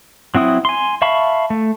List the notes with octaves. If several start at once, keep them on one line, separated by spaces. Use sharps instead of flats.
F#3 C4 E4 D#6
G#5 C6
E5 F5 A5 B5 C#6
A3